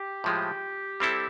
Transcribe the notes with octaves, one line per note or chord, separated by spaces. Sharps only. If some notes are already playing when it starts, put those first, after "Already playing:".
Already playing: G4
A2 F3 G#3
G3 C4 E4 A4